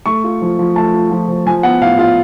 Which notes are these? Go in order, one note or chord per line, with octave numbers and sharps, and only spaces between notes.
A3 C#6
F4
F3
F3
A3 A5
F4
F3
F3
F3 G#5
B3 F#5
A2 F5
F4 F5